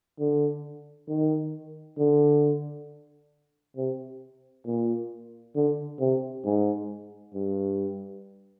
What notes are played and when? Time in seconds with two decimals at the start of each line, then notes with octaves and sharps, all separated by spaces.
0.19 D3
1.09 D#3
1.98 D3
3.76 C3
4.66 A#2
5.55 D3
6.00 C3
6.44 G#2
7.34 G2